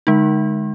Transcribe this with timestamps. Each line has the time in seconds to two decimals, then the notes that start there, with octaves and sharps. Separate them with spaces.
0.07 D3 G#3 D#4